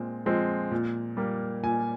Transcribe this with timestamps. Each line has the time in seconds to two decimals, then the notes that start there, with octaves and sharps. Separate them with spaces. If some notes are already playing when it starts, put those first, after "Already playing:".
Already playing: A#2 G#3 C4
0.26 F3 G#3 C4
0.71 A#2
1.17 G3 A#3
1.63 A#2 G#5